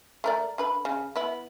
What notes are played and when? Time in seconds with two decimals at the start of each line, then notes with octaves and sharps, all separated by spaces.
0.24 A3 A#4 D5
0.58 D3 B4 B5
0.85 C#3
1.16 B3 E4